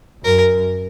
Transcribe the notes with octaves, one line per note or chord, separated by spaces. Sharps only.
F#2 A#4